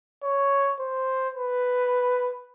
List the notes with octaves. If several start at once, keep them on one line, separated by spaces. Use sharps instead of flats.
C#5
C5
B4